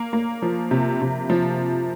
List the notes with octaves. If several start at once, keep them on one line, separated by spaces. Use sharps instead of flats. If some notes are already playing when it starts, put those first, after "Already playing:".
Already playing: A#3
A#3
F3
C3
C3
F3